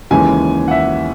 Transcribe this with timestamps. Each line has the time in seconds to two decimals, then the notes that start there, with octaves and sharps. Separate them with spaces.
0.11 D#2 C#3 E3 G#3 G#5
0.68 F#5
0.71 E5